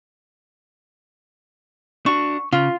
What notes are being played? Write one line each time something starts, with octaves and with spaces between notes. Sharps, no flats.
D4 F#4 C#6
C#3 F4